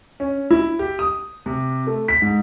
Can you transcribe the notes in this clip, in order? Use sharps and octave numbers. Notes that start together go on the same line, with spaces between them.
C#4
E4
G4
D#6
C3
A3
B6
G#2